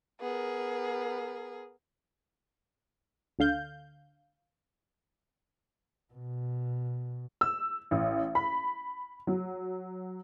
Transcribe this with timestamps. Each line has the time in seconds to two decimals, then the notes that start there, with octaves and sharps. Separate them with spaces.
0.21 B3 G#4 A#4
3.39 D2 D3 F5 G6
6.13 B2
7.41 E6
7.91 A1
8.35 B5
9.27 F#3